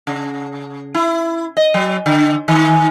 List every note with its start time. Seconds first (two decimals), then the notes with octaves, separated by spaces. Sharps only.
0.07 C#3
0.94 E4
1.57 D#5
1.74 F#3
2.06 D3
2.48 D#3